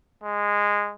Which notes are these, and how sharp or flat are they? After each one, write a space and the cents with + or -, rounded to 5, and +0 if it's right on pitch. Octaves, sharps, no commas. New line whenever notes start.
G#3 -15